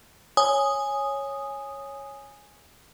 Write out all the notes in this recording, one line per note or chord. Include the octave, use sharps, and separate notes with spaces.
C#5 G#5 D#6